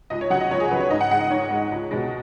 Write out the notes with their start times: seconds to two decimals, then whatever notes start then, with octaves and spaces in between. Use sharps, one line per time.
0.10 C#2 D#5
0.21 C#5
0.30 C#3 F#3 F#5
0.41 D#5
0.51 C#2 C#5
0.60 G#4
0.71 C#3 F#3 B4
0.80 C#5
0.90 G#2 D#5
1.01 F#5
1.11 G#3 F#5
1.20 D#5
1.30 G#2 C#5
1.50 G#3
1.71 C#2
1.91 B2 G#3